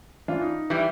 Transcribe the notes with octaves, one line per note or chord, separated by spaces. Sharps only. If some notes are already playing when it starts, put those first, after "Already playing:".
E3 D4 F4
D#4
E3 G3